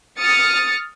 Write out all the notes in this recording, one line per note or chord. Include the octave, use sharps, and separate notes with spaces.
D#6 F6 A6 C#7